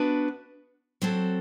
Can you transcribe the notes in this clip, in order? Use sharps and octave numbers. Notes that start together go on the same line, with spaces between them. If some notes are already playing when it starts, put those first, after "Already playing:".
Already playing: B3 D4 F#4 B4 E5
F#3 C4 F#4 A4